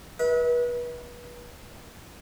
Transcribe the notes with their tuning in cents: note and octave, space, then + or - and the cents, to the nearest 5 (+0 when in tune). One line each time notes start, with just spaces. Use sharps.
B4 -30 E5 -45